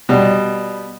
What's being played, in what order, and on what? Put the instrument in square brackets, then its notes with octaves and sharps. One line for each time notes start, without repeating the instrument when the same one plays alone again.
[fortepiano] B2 G3